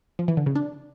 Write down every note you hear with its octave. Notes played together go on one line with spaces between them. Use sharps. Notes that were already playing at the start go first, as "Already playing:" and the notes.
F3
E3
D3
C#3
D4